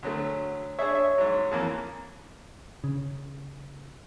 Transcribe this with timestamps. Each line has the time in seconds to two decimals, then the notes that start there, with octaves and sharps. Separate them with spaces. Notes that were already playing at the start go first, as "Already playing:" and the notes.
0.03 D2 F#3 A3
0.79 D4 G#4 C#5 E5
0.95 E5
1.18 G#2 F#3
1.51 F2 E3 A#3
2.84 C#3